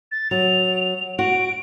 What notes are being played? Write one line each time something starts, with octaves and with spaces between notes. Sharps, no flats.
A6
F#3 F7
F#4 D7